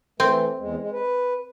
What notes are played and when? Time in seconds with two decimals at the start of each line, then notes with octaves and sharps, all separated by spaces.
0.20 E3 A3 C4
0.59 E2 G#3
0.78 G#3
0.92 B4